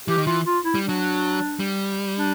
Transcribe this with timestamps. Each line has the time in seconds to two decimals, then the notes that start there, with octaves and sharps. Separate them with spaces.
0.08 E3 G4
0.18 D#3
0.27 E3 F4
0.46 F4
0.65 E4
0.75 G3
0.83 D4
0.89 F#3
1.59 G3
2.17 D4